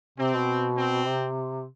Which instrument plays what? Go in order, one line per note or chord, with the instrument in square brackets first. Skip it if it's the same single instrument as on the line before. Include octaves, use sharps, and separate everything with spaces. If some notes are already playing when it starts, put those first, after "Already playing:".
[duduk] C3 [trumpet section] C4
[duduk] B2
[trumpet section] C4
[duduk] C3